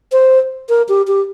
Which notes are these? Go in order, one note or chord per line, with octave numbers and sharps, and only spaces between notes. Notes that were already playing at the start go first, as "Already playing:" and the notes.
C5
A#4
G4
G4